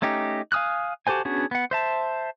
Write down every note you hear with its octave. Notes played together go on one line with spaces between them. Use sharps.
A3 C#4 D#4 G4
F5 G#5 D#6 F6 F#6
F#4 G4 A4 C5 G#5
B3 C#4 D4 F#4 G#4
B3 F#5
C5 E5 A5